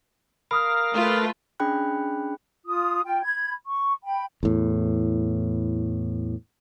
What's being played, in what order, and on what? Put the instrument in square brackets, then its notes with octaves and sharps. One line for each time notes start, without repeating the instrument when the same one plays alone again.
[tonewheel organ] A#4 F5 [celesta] B5 D#6 F6
[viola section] A3 F4 B4
[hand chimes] C#4 D4 G#4 G5 B5 F#6
[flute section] F4 D#6
F4 G5
B5 G#6
C#6
G5 B5
[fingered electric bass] E2 A2